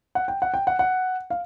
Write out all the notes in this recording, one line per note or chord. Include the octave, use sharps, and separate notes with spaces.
F#5
G5
F#5
G5
F#5
F#5
F5